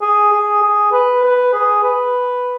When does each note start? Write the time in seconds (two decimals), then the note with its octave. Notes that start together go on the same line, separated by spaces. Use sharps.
0.02 G#4
0.32 G#4
0.62 G#4
0.92 B4
1.23 B4
1.53 G#4
1.83 B4